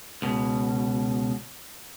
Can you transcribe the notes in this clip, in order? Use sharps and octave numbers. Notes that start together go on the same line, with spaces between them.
C#2 B2